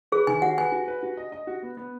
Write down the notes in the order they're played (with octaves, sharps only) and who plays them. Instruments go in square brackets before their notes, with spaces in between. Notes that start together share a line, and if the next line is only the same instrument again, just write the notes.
[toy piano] G#4 [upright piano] B4
[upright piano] D#3 [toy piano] G#5
[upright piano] F#4 [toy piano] F#5
[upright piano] B4 [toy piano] G#5
[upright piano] F#4
B4
F#4
D#5
D#5
F#4
B3
B3